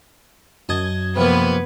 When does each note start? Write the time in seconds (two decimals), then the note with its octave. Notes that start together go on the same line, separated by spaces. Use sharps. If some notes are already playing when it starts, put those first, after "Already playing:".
0.69 F#2 D#5 A5 G#6
1.16 C3 F3 A#3 B3 B4